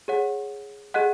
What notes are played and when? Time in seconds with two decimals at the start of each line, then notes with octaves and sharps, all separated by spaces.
0.08 G#4 C#5 F#5
0.94 G#4 D#5 F#5 F#6